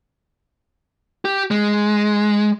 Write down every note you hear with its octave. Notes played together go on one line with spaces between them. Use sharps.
G4
G#3